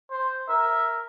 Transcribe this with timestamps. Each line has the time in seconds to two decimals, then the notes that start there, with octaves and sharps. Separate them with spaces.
0.11 C5
0.49 A#4 E5